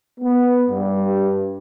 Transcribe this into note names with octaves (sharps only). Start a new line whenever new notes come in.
B3
G2